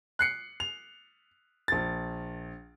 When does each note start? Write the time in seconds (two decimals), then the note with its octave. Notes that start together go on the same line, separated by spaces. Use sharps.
0.19 F#6 C7 C#7
0.60 F7
1.68 A#1 A6